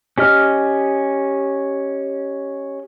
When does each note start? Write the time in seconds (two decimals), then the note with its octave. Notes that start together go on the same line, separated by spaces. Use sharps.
0.18 C#4 G4 D#5 F6